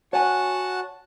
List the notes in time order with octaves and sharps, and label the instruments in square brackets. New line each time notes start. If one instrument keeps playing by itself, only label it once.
[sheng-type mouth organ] F#4 F#5 A5 [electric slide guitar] C#5 G#5